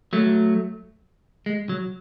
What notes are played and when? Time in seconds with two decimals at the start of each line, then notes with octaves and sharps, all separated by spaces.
0.13 F#3 A3
1.46 G#3
1.69 F#3